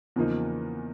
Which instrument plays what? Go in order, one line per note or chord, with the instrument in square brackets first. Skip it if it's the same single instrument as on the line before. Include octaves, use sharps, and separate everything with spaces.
[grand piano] E2 C#3 F3 A#3 D#4